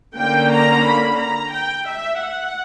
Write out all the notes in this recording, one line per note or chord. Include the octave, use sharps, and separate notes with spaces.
D3 A#3 C#4 G5
A#5
B5
A#5
G5
E5
F#5